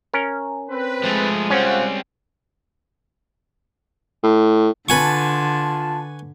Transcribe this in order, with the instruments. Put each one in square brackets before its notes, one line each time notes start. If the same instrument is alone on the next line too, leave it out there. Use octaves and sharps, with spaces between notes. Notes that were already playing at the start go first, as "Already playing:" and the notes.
[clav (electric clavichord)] C#4 A#4
[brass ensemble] C4 B4
[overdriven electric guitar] F3 A3 [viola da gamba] G#3
[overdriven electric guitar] G3 C4 [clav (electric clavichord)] C#4 [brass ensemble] F4 C5 F#5
[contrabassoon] A2
[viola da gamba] D3 [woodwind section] F4 A5 [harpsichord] B4 G#5 C#6